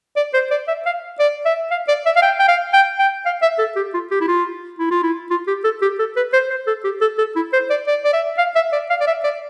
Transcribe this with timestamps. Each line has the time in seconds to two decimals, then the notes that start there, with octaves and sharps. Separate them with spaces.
0.16 D5
0.33 C5
0.51 D5
0.68 E5
0.86 F5
1.19 D5
1.45 E5
1.71 F5
1.88 D5
2.06 E5
2.16 F5
2.22 G5
2.39 G5
2.48 F5
2.73 G5
2.99 G5
3.25 F5
3.42 E5
3.58 A4
3.76 G4
3.94 F4
4.11 G4
4.21 E4
4.28 F4
4.79 E4
4.91 F4
5.03 E4
5.30 F4
5.47 G4
5.64 A4
5.82 G4
5.99 A4
6.16 B4
6.33 C5
6.50 C5
6.67 A4
6.84 G4
7.01 A4
7.18 A4
7.36 E4
7.53 C5
7.70 D5
7.87 D5
8.04 D5
8.13 E5
8.38 F5
8.55 E5
8.72 D5
8.90 F5
9.00 D5
9.07 E5
9.24 D5